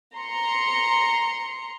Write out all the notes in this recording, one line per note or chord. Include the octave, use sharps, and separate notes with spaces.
A#5 C6 C#7